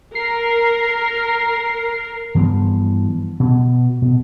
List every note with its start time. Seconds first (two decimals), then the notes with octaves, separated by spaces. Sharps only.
0.15 A#4 C7
2.35 G2 E3 F3 B3
3.40 B2
4.02 B2